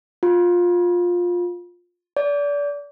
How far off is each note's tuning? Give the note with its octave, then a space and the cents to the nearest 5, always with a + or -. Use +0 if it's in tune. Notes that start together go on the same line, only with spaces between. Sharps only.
F4 +15
D5 -30